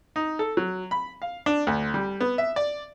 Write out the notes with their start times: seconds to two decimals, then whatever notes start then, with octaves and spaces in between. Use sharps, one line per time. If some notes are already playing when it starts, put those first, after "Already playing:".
0.16 D#4
0.39 A4
0.57 F#3
0.91 B5
1.22 F5
1.46 D4
1.67 D2
1.94 G3
2.21 B3
2.38 E5
2.56 D5